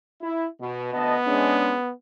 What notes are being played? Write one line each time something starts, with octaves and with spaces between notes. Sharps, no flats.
E4
B2
D2 B3 D#5 A5
G#3 C#4 D4